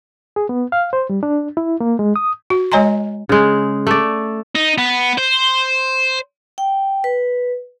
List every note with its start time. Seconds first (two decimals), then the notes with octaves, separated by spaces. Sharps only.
0.36 G#4
0.49 B3
0.72 F5
0.93 C5
1.10 G3
1.23 D4
1.57 E4
1.80 A#3
1.99 G#3
2.16 D#6
2.50 F#4
2.72 G#3 C#5 D#5 G#5 A#5 C6
3.29 C#3 G#3
3.87 A3 D5
4.56 D#4
4.78 B3
5.18 C5
6.58 G5
7.04 B4